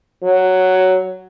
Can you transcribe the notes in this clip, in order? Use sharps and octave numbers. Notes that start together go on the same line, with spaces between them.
F#3